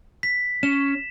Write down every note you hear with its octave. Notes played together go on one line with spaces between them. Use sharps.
B6
C#4 E7